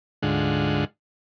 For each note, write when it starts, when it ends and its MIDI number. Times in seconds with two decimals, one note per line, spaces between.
0.22 0.85 38
0.22 0.85 44
0.22 0.85 50
0.22 0.85 56
0.22 0.85 65
0.22 0.85 78